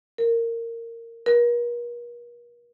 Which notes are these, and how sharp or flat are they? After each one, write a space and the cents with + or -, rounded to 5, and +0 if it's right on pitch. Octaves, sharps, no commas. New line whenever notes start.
A#4 -15
A#4 +45